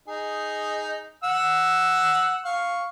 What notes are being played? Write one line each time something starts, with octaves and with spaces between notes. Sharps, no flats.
D#4 G#4
F#5 E6
F5 C#6